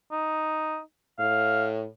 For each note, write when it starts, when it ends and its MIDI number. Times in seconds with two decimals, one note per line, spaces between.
0.12 0.80 63
1.19 1.86 45
1.19 1.66 77